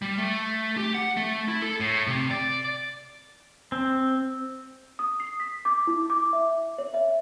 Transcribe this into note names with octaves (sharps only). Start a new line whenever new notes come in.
G3
A3
G4
F#5
A3
E4
A4
A2
C3
D5
C4
D#6
C7
B6
D6
E4
D6
E5
C#5
E5